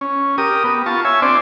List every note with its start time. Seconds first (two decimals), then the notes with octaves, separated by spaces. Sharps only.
0.01 C#4
0.38 G4 A#4 D#6
0.64 B3
0.86 F4 A5 C#6
1.05 C#5 E5 G#5
1.22 C4 D4 C5 D5